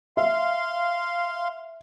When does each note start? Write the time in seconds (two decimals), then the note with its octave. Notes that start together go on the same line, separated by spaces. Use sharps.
0.17 E5 F5 C6